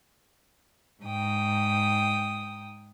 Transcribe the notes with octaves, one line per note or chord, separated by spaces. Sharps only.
G#2 G5 D#6